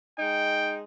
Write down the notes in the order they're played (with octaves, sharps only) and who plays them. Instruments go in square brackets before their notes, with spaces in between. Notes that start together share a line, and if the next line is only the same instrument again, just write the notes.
[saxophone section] G#3 D#4 [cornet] G5